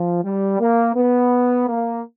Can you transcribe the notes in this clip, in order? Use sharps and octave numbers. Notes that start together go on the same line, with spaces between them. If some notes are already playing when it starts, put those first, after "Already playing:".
Already playing: F3
G3
A#3
B3
A#3